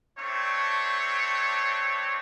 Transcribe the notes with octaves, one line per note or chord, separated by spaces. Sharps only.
A3 C4 D4 C#5